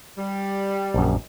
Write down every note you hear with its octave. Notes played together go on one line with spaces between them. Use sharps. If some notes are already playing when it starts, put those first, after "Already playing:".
G3
A#1 F#2